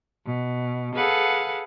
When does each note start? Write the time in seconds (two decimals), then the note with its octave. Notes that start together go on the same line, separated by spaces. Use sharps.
0.25 B2
0.96 G#4 A4 B4 F5 F#5